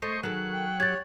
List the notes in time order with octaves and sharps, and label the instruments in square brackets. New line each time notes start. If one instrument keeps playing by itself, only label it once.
[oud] A3 [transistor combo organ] C5 D#5 C#6
[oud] D#3 G#4 A4 [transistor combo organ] F#3 F#5
[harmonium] G5
[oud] G4 [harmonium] C#5 [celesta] G#6 A6